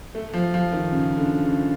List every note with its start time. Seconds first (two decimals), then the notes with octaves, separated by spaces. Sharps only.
0.15 A3
0.34 F3
0.54 F3
0.73 D#3
0.92 C#3
1.17 D3
1.44 C#3